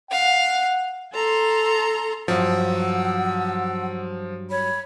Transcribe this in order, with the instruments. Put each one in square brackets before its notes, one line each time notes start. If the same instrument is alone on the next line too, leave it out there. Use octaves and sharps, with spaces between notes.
[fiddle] F5 [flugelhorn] F#5
[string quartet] A4 A#5 C6
[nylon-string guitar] G2 F#3 [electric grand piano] F3 [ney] F#5 [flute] E6
[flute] C#5 [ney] B5